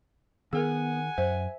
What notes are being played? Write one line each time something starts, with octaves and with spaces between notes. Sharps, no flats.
D#3 B3 G#4 A#4 F#5 G#5
F#2 C5 E5